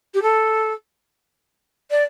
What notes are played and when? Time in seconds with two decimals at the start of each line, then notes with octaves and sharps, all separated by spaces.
0.14 G4
0.22 A4
1.91 D5